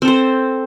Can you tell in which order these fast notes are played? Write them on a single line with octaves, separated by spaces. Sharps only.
C4 A4 C5